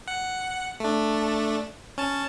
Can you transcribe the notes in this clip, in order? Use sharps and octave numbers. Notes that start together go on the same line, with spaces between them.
F#5
A3 D4
C#4 A5